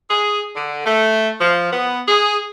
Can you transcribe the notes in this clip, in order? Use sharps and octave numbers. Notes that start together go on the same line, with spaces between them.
G#4
D3
A3
F3
B3
G#4